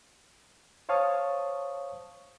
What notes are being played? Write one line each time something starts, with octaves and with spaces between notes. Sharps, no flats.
C5 C#5 F5 A5 C#6 D#6